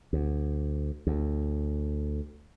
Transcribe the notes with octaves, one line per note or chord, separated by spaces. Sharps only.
D2
D2